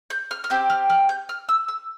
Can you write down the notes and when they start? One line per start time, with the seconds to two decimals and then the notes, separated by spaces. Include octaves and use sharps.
0.10 G6
0.31 F6
0.44 F6
0.50 C4 G4 G6
0.70 F6
0.90 F6
1.09 G6
1.29 F6
1.49 E6
1.68 E6